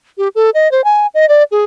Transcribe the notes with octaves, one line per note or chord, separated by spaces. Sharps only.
G4
A4
D#5
C5
G#5
D#5
D5
G#4